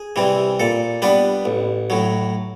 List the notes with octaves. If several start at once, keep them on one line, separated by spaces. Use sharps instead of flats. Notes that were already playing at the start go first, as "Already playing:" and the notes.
Already playing: G#4
C3 E3 G3 C4
A#2 A4
G3 B3 D4 B4
A1
A2 F#3